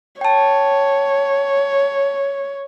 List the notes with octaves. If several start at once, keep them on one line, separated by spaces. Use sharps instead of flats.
C#5 G5 A5